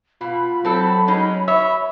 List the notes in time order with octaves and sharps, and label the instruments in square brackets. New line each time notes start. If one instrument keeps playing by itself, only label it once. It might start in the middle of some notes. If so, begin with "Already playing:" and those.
[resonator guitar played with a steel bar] B2 [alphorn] F4 [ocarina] B5
[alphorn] F#3 [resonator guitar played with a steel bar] C4 A4
[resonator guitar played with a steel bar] G#3 C#4 D#4
[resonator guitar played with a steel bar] C#5 [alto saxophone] E5